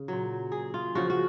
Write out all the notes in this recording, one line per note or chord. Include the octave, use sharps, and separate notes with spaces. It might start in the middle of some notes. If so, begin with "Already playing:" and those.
Already playing: C#3
A#2 F#3
G#4
F4
C#3 F3 F#4
F#4